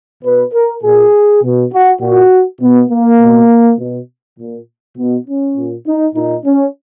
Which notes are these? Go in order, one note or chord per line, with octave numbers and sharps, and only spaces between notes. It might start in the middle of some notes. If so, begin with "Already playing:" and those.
B2 B4
A#4
A#2 G#4
B2
F#4
A#2 F#4
B2 B3
A#3
B2
B2
A#2
B2 B3
C#4
A#2
D#4
A#2 D#4
C#4